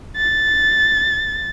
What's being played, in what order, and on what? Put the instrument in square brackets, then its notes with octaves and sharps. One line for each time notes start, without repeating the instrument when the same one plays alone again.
[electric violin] A6